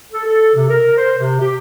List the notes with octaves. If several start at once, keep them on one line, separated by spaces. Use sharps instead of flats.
A4
A4
C3
A#4
C5
C3
G4